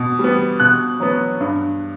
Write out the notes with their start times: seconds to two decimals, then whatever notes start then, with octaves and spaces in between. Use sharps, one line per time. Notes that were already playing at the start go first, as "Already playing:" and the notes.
Already playing: B2
0.19 G3 B3
0.60 B2 F#6
1.00 F#3 B3
1.41 G2